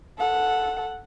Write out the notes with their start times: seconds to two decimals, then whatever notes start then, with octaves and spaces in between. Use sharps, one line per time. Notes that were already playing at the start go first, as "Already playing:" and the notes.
0.18 A4 F#5